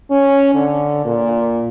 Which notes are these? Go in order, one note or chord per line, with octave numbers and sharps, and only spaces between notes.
C#4
D3
A#2